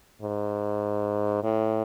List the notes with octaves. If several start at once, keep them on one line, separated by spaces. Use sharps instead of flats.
G#2
A2